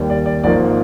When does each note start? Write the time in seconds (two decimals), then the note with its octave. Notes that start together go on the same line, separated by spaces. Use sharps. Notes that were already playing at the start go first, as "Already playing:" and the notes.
Already playing: D#2 D#3 G3
0.10 D5
0.26 D5
0.44 G#1 G#2 F3 A#3 D5